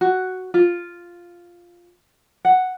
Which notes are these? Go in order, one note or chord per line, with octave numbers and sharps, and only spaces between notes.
F#4
F4
F#5